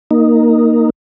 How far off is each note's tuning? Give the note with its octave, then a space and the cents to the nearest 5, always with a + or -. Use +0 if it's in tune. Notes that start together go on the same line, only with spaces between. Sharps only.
A#3 +0 D#4 +0